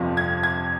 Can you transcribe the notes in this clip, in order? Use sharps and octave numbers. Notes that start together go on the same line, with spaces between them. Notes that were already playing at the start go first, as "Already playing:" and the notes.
Already playing: G1 F2 C3 F3
G#6
G#6